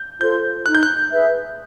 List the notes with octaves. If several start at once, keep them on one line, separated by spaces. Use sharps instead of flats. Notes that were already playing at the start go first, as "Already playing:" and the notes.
Already playing: G6
F4 A4 C5 G6
D#4 F#6
G6
F#6
G#4 B4 E5